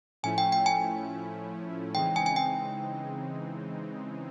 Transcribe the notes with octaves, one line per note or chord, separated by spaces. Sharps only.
A2 F3 A3 C#4 E4 G#5
G5
G5
G#5
C#3 E3 G#3 C4 D#4 G5
G#5
G#5
G5